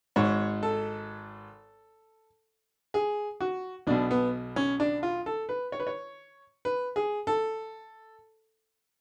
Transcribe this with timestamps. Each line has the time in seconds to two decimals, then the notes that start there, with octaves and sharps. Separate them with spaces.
0.16 G#1 G#2 C#5
0.63 A4
2.94 G#4
3.40 F#4
3.87 B1 B2 D4
4.11 B3
4.56 C#4
4.80 D4
5.03 F4
5.26 A4
5.49 B4
5.72 C#5
5.80 B4
5.87 C#5
6.65 B4
6.96 G#4
7.27 A4